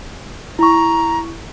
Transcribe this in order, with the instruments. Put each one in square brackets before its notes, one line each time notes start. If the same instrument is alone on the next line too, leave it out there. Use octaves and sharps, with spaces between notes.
[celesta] E4 C#6 [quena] A#5